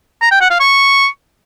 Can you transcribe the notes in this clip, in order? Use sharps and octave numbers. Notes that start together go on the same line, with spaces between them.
A#5
G5
F#5
F5
C#6